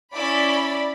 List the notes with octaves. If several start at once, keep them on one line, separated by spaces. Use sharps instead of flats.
C#4 E4 D5 B5